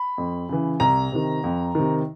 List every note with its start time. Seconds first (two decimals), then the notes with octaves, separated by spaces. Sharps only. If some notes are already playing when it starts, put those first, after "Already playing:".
Already playing: B5
0.18 F2
0.49 C#3 E3
0.80 C2 A#5
1.12 C3 D#3
1.44 F2
1.75 C3 D#3